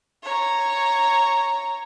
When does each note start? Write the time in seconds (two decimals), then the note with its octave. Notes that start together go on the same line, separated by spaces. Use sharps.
0.24 C#5 A#5